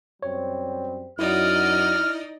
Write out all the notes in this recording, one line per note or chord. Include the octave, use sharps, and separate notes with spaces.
F#2 G3 C4 C#5
F#2 F#3 D#4 E4 D5 D#5 F6